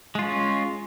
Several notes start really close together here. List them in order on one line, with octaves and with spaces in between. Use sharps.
G#3 F4 C#4